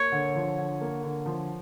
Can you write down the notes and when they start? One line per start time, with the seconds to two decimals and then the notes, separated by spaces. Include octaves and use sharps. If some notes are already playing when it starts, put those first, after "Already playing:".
Already playing: A#3 C#5
0.12 D3
0.35 F3
0.58 D3
0.81 A#3
1.03 D3
1.26 F3